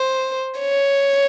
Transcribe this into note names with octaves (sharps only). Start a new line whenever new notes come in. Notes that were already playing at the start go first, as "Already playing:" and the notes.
Already playing: C5
C#5